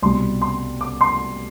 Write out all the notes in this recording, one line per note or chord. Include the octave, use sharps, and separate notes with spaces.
C2 B2 G3 C6
C6
D6
C6